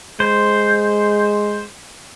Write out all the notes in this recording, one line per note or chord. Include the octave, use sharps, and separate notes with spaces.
G#3 C5